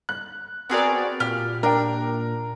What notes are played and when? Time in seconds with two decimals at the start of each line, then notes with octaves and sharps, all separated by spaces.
0.09 F#6
0.70 B3 C4 F#4 G#4 A#4 D5
1.20 A#2 G4 F6
1.63 D4 A#4 G5